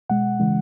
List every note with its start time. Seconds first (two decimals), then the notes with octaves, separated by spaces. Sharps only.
0.09 B2 G#3 F#5
0.40 C#3 E3 G#3